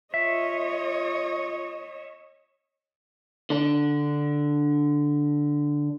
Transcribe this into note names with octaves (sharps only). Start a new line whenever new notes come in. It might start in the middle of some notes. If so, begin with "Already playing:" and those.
F4 C#5 D#5 E5
D3 D4